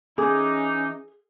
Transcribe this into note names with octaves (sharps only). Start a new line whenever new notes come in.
E3 C#4 D#4 G#4 D6